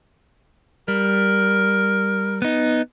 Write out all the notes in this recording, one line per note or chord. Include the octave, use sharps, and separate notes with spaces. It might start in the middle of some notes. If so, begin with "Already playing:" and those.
G3 A#4
B3 D#4